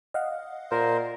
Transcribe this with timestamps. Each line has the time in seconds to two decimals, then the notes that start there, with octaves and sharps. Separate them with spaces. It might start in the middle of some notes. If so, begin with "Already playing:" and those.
0.14 D#5 F5 F#5
0.71 A#2 A#4 C5